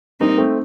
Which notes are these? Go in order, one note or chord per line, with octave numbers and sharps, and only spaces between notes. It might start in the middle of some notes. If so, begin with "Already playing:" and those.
G3 A#3 C4 D#4
A3 C4